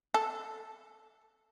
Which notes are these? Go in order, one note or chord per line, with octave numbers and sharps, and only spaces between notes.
A4